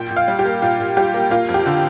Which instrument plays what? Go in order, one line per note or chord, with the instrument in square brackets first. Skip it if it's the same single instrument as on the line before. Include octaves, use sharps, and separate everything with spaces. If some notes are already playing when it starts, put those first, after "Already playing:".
Already playing: [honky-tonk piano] A#2 G5
A#2
F5
G3
G4
A#3
A#2 F4
A#2
G3 G4
A#3
A#3 F4
F2
G4
D3